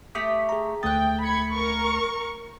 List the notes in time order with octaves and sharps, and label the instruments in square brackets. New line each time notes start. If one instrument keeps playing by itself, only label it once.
[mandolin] A3 G4 D6 [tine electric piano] D#6 B6
[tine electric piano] G#4 A#5
[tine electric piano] D2 A3 A6 [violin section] G5 [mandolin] D#6 F#6
[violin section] B5 G#6 C#7
A#4 C#6